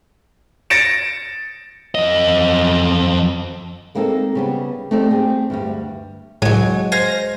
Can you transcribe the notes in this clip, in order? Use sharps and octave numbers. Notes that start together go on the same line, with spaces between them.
A6 A#6 C#7 D7 E7
F2 D#5
G#3 A#3 C4 D#4 G#4 A4
C#3 G3 B3
A3 C4 D#4 G4 A4 D5
C4 G4 G#4
D2 G2 G3
C#2 A2 F#3 G#3
C5 F5 G#5 A#6